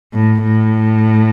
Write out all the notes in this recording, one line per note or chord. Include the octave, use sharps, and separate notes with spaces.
A2
A2